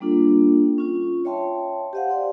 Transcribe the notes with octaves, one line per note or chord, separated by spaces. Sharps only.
G3 A#3 D4 F4 A4
C#4 F4
C#5 D#5 E5 G5 A5 C6
G4 C5 D#5 F5 F#5
D5 G5 C6